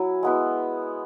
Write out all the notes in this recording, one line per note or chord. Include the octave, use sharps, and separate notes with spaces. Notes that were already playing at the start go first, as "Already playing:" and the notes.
Already playing: F#3 E4 G#5
G#3 B3 E4